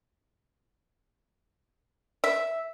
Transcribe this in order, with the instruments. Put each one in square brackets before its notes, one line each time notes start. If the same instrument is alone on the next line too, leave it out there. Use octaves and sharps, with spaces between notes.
[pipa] E5